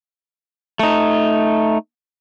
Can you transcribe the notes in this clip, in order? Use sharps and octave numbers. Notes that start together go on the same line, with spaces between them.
A3 D#4